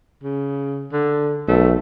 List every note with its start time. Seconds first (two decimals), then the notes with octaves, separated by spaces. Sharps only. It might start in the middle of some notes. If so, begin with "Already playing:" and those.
0.23 C#3
0.92 D3
1.48 B1 A3